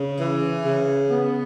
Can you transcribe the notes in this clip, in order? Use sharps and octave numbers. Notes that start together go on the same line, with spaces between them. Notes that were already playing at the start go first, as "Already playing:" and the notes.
Already playing: C#3
E3
C#3
B3